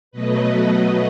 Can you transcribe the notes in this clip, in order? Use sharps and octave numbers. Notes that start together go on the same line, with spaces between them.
B2 F#3 A3 B4 D#5
B4 D#5